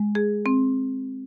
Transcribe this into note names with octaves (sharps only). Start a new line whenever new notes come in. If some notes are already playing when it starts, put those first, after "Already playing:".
Already playing: G#3
G#4
C4